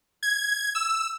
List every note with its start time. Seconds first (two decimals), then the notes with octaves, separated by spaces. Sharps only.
0.23 G#6
0.75 E6